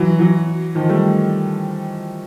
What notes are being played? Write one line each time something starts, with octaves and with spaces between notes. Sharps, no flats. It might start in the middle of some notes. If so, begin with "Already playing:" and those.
Already playing: E3 F#3
E3 F#3
D#3 F3
G3 A3